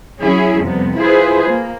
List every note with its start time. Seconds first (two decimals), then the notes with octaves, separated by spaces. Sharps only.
0.20 F#3 C#4 E4 G#4
0.61 F2 C3 G3 B3
0.97 E4 F4 G#4 B4 C5
1.49 A#3